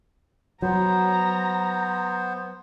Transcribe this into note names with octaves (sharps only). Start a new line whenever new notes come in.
F#3 B3 C5 A#5